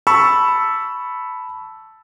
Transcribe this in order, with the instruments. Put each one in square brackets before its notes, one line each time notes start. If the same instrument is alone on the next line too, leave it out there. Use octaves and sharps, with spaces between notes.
[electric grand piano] A5 B5 C#6 E6